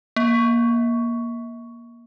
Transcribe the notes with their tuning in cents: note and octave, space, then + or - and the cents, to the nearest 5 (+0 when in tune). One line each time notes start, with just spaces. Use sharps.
A#3 +20